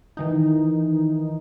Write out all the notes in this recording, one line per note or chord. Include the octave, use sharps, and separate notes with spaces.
D#3 E3 D#4